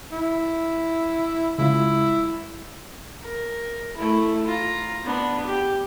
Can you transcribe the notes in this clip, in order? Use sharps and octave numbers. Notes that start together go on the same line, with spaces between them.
E4
C#3 G#3 E4 F4
A#4
A3 E4
F4 A#5
B3 D4
G4